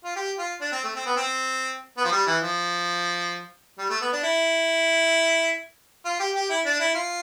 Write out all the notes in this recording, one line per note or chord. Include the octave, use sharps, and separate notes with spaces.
F4
G4
F4
D4
C4
A3
C4
B3
C4
B3
F3
G3
E3
F3
G3
A3
B3
D4
E4
F4
G4
G4
E4
D4
E4
F4